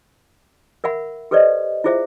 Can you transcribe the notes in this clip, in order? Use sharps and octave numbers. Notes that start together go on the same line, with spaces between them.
A#4 E5 F#5 B5
G4 A4 B4 C5 D5 D#5
E4 F4 G#4 C5 E5